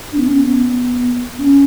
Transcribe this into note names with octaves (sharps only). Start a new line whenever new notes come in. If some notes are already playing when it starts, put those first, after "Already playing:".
D4
B3
C#4
B3
C#4